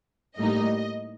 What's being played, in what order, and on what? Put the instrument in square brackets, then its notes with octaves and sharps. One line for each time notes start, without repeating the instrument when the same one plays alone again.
[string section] A2 G3 A#3 D#4 D#5